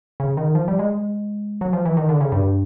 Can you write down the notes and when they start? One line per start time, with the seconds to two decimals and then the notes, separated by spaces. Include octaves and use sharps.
0.20 C#3
0.37 D#3
0.55 F3
0.68 G3
0.79 G#3
1.61 F#3
1.73 F3
1.85 E3
1.97 D#3
2.09 D3
2.21 C#3
2.32 G2